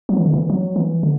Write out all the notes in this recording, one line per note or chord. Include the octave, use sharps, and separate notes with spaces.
F#3
E3
D3
E3
F#3
E3
D3